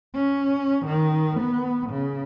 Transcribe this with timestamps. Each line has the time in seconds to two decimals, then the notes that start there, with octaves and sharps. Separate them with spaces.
0.15 C#4
0.86 D#3
1.40 B3
1.90 C#3